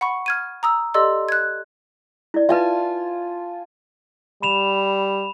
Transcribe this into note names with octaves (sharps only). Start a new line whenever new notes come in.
F#5 B5 C#6
F6 G#6 D#7
A#5 D#6 E6
G4 A4 D5 D#5 C6 E6
F#6 G#6
E4 D5
F4 B4 E5 G#5 A5
G3 B5 E7 F7